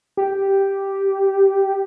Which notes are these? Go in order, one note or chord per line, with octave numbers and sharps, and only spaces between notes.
G4